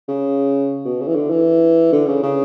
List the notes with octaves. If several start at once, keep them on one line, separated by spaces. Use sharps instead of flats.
C#3
B2
C#3
E3
D3
E3
D3
C#3
C#3